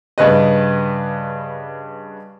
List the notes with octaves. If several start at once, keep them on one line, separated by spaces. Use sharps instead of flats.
G2 C#3 B4 D#5